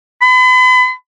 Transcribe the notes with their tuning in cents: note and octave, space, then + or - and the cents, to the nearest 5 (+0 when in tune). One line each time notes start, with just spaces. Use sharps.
B5 +40